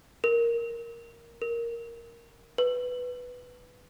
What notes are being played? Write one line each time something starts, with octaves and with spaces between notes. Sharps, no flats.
A#4
A#4
B4